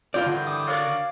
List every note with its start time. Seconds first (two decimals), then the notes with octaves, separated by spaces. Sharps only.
0.14 G2 D#3 E3 F4 D5 G6
0.26 D3
0.47 D6 D#6
0.67 F#4 A#4 C#5 D5 F5 D6